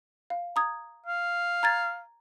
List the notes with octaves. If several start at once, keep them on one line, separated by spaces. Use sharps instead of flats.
F5
A#5 D#6 G#6
F5
A#5 G#6 A6